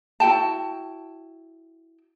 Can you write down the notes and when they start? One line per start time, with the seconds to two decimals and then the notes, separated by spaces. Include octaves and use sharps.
0.20 E4 F#4 G5 A5